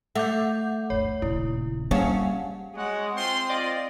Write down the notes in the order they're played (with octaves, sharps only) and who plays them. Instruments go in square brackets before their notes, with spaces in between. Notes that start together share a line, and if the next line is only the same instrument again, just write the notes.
[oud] A3 [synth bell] F#5 D6 G6
[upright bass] G1 D2 [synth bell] C#5
[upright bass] D#1 C#3 [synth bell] E4
[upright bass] G3 [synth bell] A#3 F5 F#5 [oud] C#4
[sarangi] G#3 [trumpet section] F#4 C#5 F#5
[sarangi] C4 [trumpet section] F4 C5 C6
[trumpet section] F4 [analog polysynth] D5 D#5